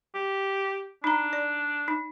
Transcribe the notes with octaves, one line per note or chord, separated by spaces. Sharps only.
G4
D4 D#4 A#5
D5
D#4